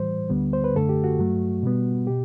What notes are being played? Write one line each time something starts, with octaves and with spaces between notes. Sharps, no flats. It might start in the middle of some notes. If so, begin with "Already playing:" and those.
Already playing: A2 E3 G3 C5
D2 D3 G3 B3
C5
B4
F#2 D3 A3 A4
G4
F#4
G2 F#3 A3
B2 G3 B3
B2 G4